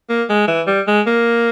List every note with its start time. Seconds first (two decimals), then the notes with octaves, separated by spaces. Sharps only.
0.10 A#3
0.30 G#3
0.48 E3
0.67 G3
0.88 G#3
1.07 A#3